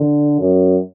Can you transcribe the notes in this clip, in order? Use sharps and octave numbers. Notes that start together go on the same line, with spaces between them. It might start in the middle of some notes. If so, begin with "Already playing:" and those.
Already playing: D3
F#2